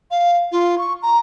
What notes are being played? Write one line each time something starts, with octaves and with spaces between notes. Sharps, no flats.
F5
F4
C#6
A#5